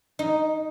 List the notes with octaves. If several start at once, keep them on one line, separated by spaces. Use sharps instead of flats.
D#4